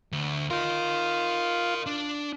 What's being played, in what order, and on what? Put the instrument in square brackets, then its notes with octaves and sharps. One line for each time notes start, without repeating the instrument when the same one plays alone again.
[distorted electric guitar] D2
[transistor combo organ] F4 [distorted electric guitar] A#4 D#5
[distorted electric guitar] D4